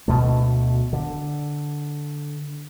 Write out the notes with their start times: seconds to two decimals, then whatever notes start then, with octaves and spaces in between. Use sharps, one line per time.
0.08 D2 B2 A3
0.93 D3